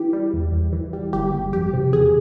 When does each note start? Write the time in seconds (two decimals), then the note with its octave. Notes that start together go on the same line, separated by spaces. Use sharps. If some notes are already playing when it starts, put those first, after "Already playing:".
Already playing: E3 G4
0.13 G3
0.33 E2
0.52 E2
0.73 E3
0.93 G3
1.13 G1 G4
1.33 G1
1.53 F2 G4
1.73 C3
1.93 E2 G#4